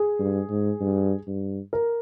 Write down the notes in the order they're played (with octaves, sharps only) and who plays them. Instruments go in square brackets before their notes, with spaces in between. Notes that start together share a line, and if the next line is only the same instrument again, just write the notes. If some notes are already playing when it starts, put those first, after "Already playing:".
Already playing: [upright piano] G#4
[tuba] G2
G#2
G2
G2
[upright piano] A#4